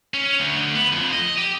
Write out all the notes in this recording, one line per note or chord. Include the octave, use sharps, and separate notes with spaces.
C#4
D2
B3
F2
D#5
G4